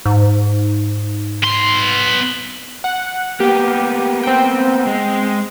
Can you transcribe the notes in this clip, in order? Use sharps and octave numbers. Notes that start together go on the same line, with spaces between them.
G#2
B3 C6
F#5
A#3 B3 G4
C4 G5
G#3